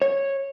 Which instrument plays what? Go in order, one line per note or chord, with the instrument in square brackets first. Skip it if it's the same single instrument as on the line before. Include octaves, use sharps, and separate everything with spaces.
[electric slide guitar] C#5